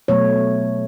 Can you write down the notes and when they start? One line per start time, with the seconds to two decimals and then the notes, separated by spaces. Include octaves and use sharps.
0.08 B2 F#3 A3 C#5